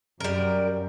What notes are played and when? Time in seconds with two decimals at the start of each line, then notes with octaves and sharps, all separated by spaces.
0.20 F#2 G3 A#4